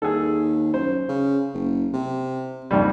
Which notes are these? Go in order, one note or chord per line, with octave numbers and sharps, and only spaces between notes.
D#2 G#4 A4
F#2 C5
C#3
F#1
C3
A#1 F2 G#2 G3